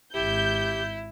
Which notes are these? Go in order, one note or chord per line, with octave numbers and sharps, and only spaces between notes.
G#1 E4 G4 G6